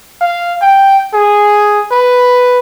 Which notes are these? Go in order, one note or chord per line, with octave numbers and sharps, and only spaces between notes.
F5
G5
G#4
B4